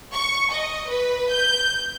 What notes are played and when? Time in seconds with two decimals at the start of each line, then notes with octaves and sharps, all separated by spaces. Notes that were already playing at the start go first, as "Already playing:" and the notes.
0.14 C#6
0.51 D#5
0.89 B4
1.30 G6